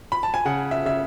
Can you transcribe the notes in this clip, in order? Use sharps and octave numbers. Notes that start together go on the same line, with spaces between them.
B5
A5
G#5
C#3 F#5
E5
C#3 E5